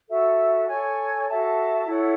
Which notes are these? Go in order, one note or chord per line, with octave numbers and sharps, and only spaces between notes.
F#4 A4 E5
A4 C#5 G#5
F#4 A4 E5 A5
E4 A4 C#5 F#5